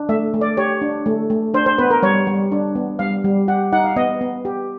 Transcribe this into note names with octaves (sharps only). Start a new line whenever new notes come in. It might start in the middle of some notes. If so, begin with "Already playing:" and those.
Already playing: D4
A3 E5
A3
D5
G4 C#5
D4
A3
A3
D4 C5
C5
B3 B4
A#4
G3 C#5
G3
D4
B3
G3 F5
G3
G4 F#5
D#4 F#5
F5
B3 D#5
B3
G4